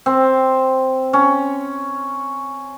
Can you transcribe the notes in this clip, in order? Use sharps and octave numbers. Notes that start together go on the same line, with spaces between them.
C4
C#4